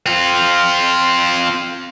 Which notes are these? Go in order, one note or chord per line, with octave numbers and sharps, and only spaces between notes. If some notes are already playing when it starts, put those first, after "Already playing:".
C4 F4